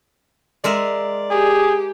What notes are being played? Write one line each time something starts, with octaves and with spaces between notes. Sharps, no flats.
G#3 A#4 D5 E5
G4 G#4